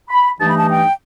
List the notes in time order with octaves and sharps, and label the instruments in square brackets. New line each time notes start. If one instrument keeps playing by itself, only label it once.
[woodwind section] B5
G2 E3 A3 D#4 A5
B5
A5
G5